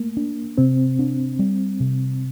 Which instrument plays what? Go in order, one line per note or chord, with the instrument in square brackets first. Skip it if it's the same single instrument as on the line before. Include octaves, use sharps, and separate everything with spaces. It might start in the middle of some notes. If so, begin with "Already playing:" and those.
Already playing: [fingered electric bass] A3 [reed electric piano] A#3
[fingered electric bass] D4
[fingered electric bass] C3 [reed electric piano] C4
[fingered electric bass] D4
G3
C3